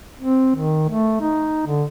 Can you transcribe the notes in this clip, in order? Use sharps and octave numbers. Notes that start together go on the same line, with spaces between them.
C4
D#3
A3
D#4
D3